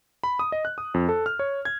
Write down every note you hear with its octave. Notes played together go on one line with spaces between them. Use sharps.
B5
D#6
D#5
F#6
D#6
F2
A4
F6
C#5
G#6